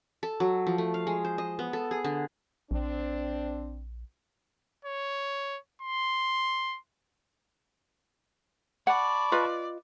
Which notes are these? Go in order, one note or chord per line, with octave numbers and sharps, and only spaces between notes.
A4
F#3
F3
A3
F5
G#3
C5
D#5
B3
A4
G#4
D3
A#1 C4 D4
C#5
C6
D5 F#5 A5 B5 C#6
F4 B4 D#5